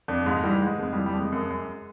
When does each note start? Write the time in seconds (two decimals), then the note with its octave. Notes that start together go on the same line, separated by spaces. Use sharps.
0.08 F2 D4
0.26 G#2 G#3
0.43 E3 G3
0.62 G#2 G#3
0.79 F2 G#3
0.92 G3
0.97 E3
1.06 G3
1.14 F2 G#3
1.32 F#2
1.50 F#2